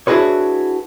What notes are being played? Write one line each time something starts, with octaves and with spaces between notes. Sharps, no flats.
D4 E4 F#4 G#4 B4 C#5